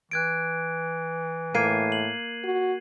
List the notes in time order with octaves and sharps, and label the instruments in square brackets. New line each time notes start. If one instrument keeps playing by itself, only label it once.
[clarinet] E3 [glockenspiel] F#6 G#6 D7
[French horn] A2 [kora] A#3 [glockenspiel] G#6 C7 D#7
[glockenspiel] F#7
[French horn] F#4